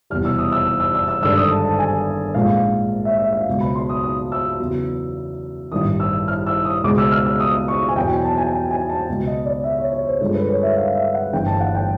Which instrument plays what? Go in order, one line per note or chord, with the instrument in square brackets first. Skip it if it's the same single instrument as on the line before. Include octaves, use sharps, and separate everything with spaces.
[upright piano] F1 E2 B2 G3 F6
E6
D#6
E6
E6
E6
E6
E6
G#1 G2 D3 E6
D#6
A5
A5
G#5
A#1 G#2 F3 G#3 F5
E5
E5
F5
C#2 B2 F#3 B3
B5
C6
D#6
D#6
E6
E2 C#3 F#3 B3
A1 G2 D#3 D#6
E6
F6
E6
D#6
C#2 B2 G#3 D6
E6
F6
E6
D#6
C#6
G#5
E2 B2 F#3 G5
G#5
A5
G#5
G5
G#5
A5
C#2 B2 F#3
D#5
D5
E5
C#5
C#5
C5
G2 D3 F3 G#3 A4
B4
C#5
E5
F5
E5
F#5
G1 G2 E3 A3 G5
A5
F#5
G5